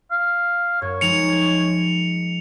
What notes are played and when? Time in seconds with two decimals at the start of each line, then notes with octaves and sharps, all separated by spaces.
0.11 F5
0.82 F#2 C#5
1.01 F3 G#3 D#4 C#7 F7